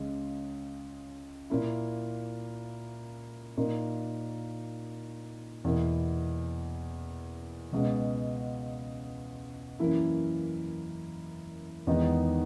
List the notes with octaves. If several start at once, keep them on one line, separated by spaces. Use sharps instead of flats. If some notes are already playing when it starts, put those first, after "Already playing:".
Already playing: C#2 C#3 G#3
A#2 A#3 E4
A#2 A#3 D#4
E2 B2 A#3 E4
C#2 B2 G#3 B3
F#2 E3 A#3 E4
E2 D#3 G#3 B3 D#4